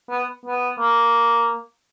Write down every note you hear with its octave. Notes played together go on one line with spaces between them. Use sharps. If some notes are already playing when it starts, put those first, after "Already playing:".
B3
B3
A#3